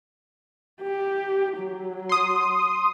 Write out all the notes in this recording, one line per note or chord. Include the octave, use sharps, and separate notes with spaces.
G4
F#3
C6 D#6